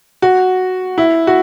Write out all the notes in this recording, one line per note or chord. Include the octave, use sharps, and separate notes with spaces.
F#4
E4
F#4